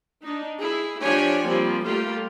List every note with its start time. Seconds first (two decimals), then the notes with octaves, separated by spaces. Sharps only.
0.23 D4 D#4
0.60 E4 G#4
1.03 F3 D4 G4 C#5 G#5
1.48 F3 G3 A#3 C4
1.85 G3 A3 A#3 F4 G4